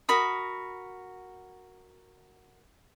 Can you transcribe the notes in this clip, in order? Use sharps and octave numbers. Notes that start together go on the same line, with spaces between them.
F#4 A#4 B5 D#6